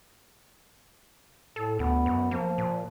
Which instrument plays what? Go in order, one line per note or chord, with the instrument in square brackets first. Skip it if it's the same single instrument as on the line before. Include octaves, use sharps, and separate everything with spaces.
[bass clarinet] A2 [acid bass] A4
[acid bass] D2 [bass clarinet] B3
[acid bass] F#2
[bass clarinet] F3 [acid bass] A#3
[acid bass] A#2